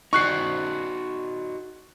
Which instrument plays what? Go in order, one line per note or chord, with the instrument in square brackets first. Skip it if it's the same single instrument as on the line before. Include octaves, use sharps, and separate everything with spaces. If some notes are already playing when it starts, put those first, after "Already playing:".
[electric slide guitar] D#4 F#4 D5 [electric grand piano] C#6 F#6 C7